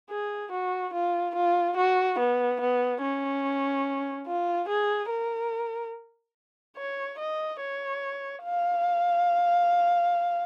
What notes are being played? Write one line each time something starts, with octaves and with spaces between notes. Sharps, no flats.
G#4
F#4
F4
F4
F#4
B3
B3
C#4
F4
G#4
A#4
C#5
D#5
C#5
F5